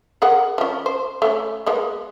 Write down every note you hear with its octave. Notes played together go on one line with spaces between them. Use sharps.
G#4 A#4 F#5
F3 C#4
C5
A3 C#4
G#3 A#3 B3